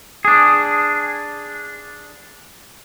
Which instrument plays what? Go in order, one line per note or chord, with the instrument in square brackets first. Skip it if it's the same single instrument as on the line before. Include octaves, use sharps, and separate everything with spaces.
[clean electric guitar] D4 G#4